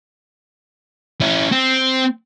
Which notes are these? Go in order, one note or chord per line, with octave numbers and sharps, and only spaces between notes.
C#4 E4
C4